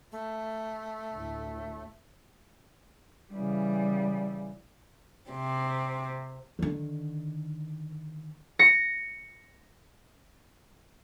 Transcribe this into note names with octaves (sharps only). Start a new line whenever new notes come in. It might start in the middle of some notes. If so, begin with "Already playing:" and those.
A3
D2 A2
C#3 E3 G3
C3 C4
D3 D#3
A#6 C#7